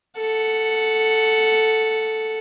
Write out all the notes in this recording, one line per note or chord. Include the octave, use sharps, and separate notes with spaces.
A4 F#5